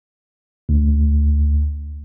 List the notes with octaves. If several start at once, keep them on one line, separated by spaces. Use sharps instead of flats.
D2